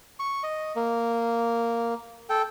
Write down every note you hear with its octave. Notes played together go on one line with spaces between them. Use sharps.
C#6
D#5
A#3
A4 G5